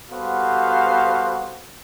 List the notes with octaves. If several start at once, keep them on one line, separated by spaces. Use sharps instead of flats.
G3 B3 F#4 A4 C5 F5